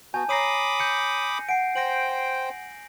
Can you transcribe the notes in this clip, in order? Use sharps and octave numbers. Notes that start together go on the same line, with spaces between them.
B3 F#4 G#5 A5 G6
C#5 A#5 B5 D6 D#6 A#6 C7 D#7
G6 C#7
F#5 G#5 C7 D7
C5 G5 A#6 D7 F#7